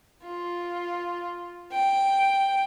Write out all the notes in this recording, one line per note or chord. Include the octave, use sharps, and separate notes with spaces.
F4
G5